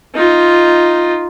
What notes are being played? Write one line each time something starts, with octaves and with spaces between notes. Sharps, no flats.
D#4 F4